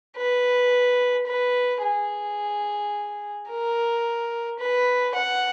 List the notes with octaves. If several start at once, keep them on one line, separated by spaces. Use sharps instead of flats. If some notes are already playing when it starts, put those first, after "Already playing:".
B4
B4
G#4
A#4
B4
F#5